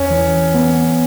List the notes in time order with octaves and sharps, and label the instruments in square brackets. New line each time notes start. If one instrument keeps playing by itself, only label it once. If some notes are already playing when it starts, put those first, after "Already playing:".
Already playing: [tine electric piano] E2 [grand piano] C#4
[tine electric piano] E3
B3